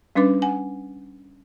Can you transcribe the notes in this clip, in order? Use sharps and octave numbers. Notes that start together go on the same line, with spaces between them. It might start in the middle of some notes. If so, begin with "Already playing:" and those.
G3 C#4 D4 B4 D6
F#5 G#5